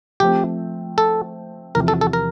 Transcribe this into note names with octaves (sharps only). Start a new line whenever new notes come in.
F3 A3 C4 G4
A4
E2 C3 F3 A#4
A4
A4
A#4